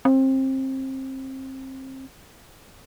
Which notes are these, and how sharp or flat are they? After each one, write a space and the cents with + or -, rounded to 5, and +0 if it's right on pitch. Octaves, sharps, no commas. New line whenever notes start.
C4 +25